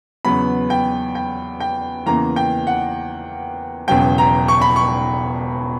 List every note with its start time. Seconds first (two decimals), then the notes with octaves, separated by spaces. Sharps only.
0.25 E2 C#3 F#3 B3 B5
0.70 G5
1.15 G5
1.60 G5
2.06 E2 C#3 E3 A#3 A#5
2.36 G5
2.67 F#5
3.88 E1 E2 C#3 F#3 G5
4.18 A#5
4.48 C#6
4.62 B5
4.76 C#6